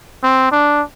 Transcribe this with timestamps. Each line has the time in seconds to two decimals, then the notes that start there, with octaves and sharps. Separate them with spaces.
0.23 C4
0.52 D4